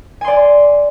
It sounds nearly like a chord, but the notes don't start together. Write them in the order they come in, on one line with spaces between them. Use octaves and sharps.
G#5 C6 D5